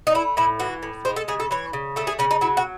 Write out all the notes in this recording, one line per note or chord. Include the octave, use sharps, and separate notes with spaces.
D#4
A3 E4
A2 E4
E3 F#4
A2
G#3 C5
A4
C#3 G#4
A4
E3 C#5
C#3
A3 A4
G#4
C#3 C#4
D#4
F#3 E4
F#4